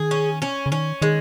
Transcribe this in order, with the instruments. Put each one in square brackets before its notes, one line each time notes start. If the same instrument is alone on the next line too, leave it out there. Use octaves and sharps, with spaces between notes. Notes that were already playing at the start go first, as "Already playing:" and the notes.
Already playing: [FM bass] D#3 [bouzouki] G#4
[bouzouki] C#4
C#4
[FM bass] C#3
[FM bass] D#3 [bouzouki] C#4
[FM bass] D#3 [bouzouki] G#3